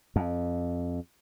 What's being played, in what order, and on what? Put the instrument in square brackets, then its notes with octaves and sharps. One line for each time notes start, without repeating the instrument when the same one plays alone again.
[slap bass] F2